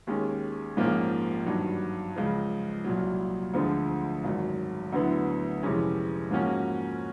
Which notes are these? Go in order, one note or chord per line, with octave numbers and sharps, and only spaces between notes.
D#2 D#3 G#3 C#4
A#1 G#2 F3 A#3 C#4
G2 D#3 F#3
C#2 C#3 F3
C2 A#2 F#3
D2 D3 F3 G#3 C4
G#1 F#2 D#3 F#3
D2 D3 F#3 B3 E4
F2 C3 E3 G#3 C#4
G#2 F3 A#3 C#4 F#4